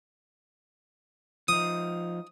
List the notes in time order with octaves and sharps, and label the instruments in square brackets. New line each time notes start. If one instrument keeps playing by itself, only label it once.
[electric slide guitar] F3 D#4 [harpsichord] D#6